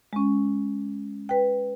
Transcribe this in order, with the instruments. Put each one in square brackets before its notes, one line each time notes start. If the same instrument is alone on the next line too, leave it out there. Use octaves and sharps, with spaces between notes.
[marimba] G#3 C#4
B4 G5